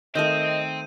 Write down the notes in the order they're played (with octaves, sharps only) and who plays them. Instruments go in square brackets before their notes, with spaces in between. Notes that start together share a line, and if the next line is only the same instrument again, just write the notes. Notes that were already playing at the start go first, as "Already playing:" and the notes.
[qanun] D#3 A3 [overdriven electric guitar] C4 [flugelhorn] D#5 [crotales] G6 D#7